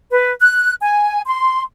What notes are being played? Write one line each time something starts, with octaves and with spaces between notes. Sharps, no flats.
B4
F#6
G#5
C6